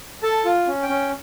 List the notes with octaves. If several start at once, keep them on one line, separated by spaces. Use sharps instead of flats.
A4 A5
F4
C#4
G5
C#4